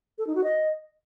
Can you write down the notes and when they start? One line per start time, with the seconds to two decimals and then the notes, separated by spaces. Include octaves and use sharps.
0.18 A4
0.27 D#4
0.35 F#4
0.44 D#5